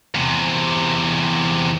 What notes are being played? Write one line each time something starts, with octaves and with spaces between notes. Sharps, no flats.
E2 C3